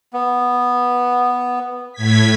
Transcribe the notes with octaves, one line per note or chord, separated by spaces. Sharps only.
B3
A2 G#6 B6